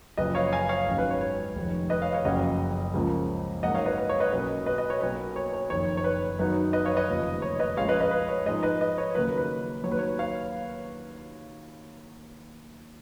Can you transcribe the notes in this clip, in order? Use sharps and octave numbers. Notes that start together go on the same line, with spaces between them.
F#1 F#2 C#3 F3 B4 D#5
C#5 F5
F5 G#5
C#5 F5
G#1 G#2 F#3 C#4
B4
C#5
C#5
F1 F2 D#3
B4 D#5
C#5 F5
C#5 F5
F#1 F2 C#3 F#3 C#4 D#5 F#5
C#2 C#3 F3 A#3 C#4
G#2 F#3 A#3 D#5 F#5
C#5 F5
B4 D#5
B4
C#5
B4 D#5
B1 B2 A#3 C#4 B4 D#5
B4 D#5
B4 D#5
C#5
B1 B2 A#3 B4
C#5
C#5
F#1 F2 D#3 C#5
C#5
B4
F#2 D#3 F#3 B3 D#4 B4
B4 D#5
C#5 F5
B4 D#5
F1 D#2 C#3 F3
C#5
B4 D#5
A#1 A#2 G#3 C#4 C#5 F5
B4 D#5
B4 D#5
B4
C#5
G#2 F3 G#3 D#4 B4 D#5
B4 D#5
B4 D#5
C#5
D#2 C#3 F#3 A#3 B4
B4
D#2 D#3 F#3 B4 C#5
C#5
C#5 F5